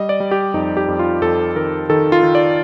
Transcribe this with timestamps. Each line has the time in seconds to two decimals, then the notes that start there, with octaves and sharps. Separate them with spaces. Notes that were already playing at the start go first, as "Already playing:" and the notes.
Already playing: G3 D#5
0.09 D5
0.20 G3
0.31 G4
0.54 F2 D#4
0.77 G4
0.88 F2
0.99 F4
1.22 F2 A4
1.56 D#3 A#4
1.90 D#3 A4
2.12 F4
2.23 D#3
2.35 D5